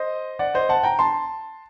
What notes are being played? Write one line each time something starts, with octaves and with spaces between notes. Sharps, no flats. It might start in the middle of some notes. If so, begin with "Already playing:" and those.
Already playing: C5 D#5
D5 F#5
C5 D#5
F#5 A5
G5 A#5
A5 C6